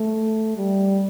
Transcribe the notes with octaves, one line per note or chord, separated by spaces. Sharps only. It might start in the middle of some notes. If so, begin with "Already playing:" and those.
Already playing: A3
G3